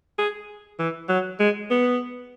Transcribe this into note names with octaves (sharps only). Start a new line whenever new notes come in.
G#4
E3
F#3
G#3
B3